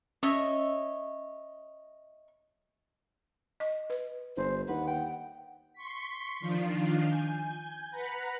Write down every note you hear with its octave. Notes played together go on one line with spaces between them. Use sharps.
C#4 C#5 D#5 E5
D#5
B4
G1 C5
D#2 B4 F#5
G5
C6 C#6 B6
D#3 F3 D4 F4
G#5 G6
B4 F#5 A#5 B5